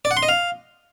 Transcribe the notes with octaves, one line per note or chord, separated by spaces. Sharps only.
D5
F#5
C6
D#5
F5